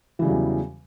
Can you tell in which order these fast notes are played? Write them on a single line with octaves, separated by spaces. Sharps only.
E3 C#3 G3 F#3 E2